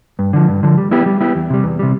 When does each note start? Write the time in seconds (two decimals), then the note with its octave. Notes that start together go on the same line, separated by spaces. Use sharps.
0.19 G2
0.33 D3 F3
0.48 G2
0.63 D3 F3
0.78 G3
0.91 B3 E4 G4
1.06 G3
1.21 B3 E4 G4
1.35 E2
1.50 C3 G3
1.64 E2
1.79 C3 G3